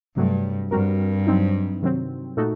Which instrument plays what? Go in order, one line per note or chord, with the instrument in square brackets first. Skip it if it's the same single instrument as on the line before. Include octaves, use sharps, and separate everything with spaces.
[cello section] G2 [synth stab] C3 F#3 A3
[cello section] G2 [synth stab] G3 C4 F#4 A#4
[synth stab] F#3 C4 D#4
C3 D#3 F#3 C4
A#2 A3 D#4 F#4 A4